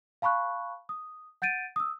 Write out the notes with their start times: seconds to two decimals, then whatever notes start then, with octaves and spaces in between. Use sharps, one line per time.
0.22 F5 A5 B5 C#6 F#6
0.89 D#6
1.42 F#5 G6 A6 D7 D#7
1.76 D#6 E6